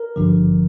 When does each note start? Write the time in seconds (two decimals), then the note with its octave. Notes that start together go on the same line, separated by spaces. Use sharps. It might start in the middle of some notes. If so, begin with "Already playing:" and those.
Already playing: A#4
0.16 G#1 G2 D3 F3